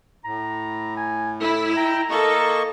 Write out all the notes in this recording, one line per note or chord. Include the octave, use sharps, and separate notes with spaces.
A2 A#5
G#5
E4 A4
G5 A#5
A#3 A4 D#5 C#6